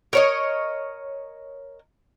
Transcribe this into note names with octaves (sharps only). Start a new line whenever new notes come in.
A#4 C#5 D#5